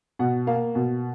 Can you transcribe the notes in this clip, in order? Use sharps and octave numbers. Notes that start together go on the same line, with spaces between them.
B2 F#5
A#3 F5
B2